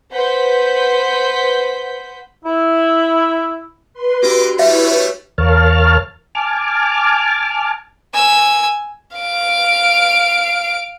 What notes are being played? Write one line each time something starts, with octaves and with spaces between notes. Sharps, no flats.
B4 C5 F#5 G6 B6
E4
B4 C6
A#3 D4 F#4 G4 A#5 D6
G3 A3 E4 B4 C#5 E5
E2 A#4 C#5 F5 A5 F6
G#5 A5 D6 F6
G#5 E6
F5 D7